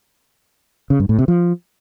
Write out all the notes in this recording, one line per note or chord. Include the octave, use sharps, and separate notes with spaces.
C#3
G2
A2
C3
F3